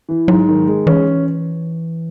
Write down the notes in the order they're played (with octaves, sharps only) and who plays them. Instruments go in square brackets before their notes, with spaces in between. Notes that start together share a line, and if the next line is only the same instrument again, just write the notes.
[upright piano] E3
[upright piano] G#2 [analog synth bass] F#3
[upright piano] D#3
G#3
[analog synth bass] E3 [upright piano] C#4